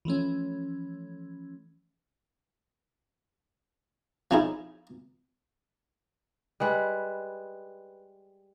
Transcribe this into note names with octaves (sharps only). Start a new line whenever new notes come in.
E3 F3 A3 C#4
F3 C#4 D#4 E4 G#4
G3 G#3 B4